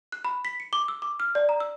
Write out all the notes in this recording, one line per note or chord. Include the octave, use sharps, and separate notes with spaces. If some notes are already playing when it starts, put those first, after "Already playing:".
F#6
B5
B6
C#7
D6
E6
D6
F6
D5
A#5
E6